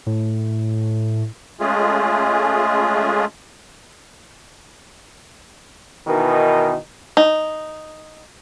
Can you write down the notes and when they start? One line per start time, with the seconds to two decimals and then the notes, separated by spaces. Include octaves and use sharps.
0.06 A2
1.60 G#3 A3 C#4 F4 G#4
6.07 B2 D#3 E3 D#4 A#4
7.17 D#4